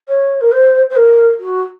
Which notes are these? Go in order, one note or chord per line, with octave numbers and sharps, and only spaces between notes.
C#5
A#4
C5
C5
A#4
F#4